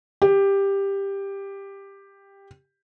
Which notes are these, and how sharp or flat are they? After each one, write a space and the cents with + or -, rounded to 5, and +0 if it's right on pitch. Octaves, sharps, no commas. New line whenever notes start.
G4 +10